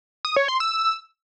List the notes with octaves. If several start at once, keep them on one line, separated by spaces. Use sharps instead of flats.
D#6
C#5
C6
E6